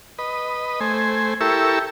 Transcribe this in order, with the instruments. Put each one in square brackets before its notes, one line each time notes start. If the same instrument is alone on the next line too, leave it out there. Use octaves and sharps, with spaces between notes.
[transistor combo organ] B4 D#5
A3 C5 G#5
E4 G4 A4 A#4 C#6 E6